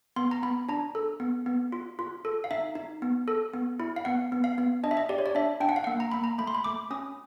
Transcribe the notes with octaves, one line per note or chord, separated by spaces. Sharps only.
B3 C6
A#5
B3 B5
D4 A#5
A4
B3
B3
F4
F4
A4
F5
D#4 E5
D#4
B3
A4
B3
E4
F5
B3 F#5
B3
F5
B3
D4 D#5
E5
D#5
G4 D5
C#5
D5
D4 E5
D4 G5
F#5
F5
A#3 F#5
A#5
A#3 B5
A#5
A3 B5
C6
B5
A3 D6
C#4 D#6